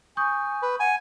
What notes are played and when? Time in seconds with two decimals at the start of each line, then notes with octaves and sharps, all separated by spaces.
0.17 G#5 C#6 D#6 G6
0.62 B4
0.80 F#5 G#5